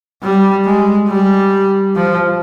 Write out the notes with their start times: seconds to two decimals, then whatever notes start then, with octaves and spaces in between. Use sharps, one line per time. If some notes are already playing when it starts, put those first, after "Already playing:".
0.23 G3
0.66 G#3
1.09 G3
1.96 F3